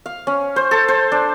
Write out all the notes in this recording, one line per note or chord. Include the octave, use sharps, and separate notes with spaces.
F5
C#4
C5
A4
C5
D4